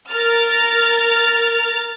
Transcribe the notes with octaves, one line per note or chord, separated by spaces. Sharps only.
A#4 F6 A6